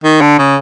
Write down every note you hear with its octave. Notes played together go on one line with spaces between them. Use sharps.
D#3
D3
C#3